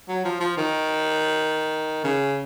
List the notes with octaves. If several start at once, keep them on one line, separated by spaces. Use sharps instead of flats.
F#3
F3
F3
D#3
C#3